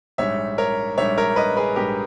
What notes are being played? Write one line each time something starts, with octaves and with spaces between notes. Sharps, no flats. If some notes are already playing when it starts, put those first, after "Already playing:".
A#1 G#2 G3 C#5 E5
A#4 C#5
A#1 G#2 G3 C#5 E5
A#4 C#5
B4 D#5
G#4 B4
A#1 G#2 G3 G4 A#4